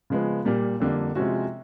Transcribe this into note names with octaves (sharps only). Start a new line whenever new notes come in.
C#3 F3 G#3 B3
A#2 G3 A#3
F2 D3 G3 A#3
C3 F3 G#3 C#4 F#4